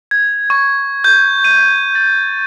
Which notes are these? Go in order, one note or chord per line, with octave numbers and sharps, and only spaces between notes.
G#6
C#6
G6
D#7
A6